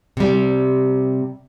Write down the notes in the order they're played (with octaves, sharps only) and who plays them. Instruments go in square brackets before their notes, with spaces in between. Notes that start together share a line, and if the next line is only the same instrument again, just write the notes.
[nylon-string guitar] C3 G3